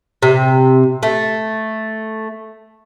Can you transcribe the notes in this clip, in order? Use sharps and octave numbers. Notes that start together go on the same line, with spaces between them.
C3
A3